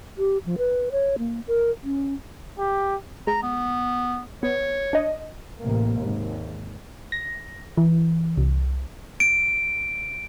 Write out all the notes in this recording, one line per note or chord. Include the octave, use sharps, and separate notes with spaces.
G4
F3
B4
C#5
A#3
A#4
C#4
G4
G#3 A#5
B3
B3 C#5
D4 D#5
A1 C3 A#3
G#1 D#2
A#6
E3
C2
D7